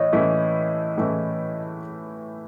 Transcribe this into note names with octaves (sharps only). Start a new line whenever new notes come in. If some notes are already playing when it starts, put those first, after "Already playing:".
Already playing: A2 E3 C#5 D#5
A2 E3 A3 C#4 E4
A2 E3 A3 C#4 E4